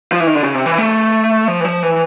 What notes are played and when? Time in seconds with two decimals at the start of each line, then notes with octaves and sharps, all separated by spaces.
0.12 F3
0.20 E3
0.27 D#3
0.35 D3
0.43 C#3
0.55 C3
0.66 E3
0.78 A3
1.48 F3
1.60 E3
1.65 F3
1.83 E3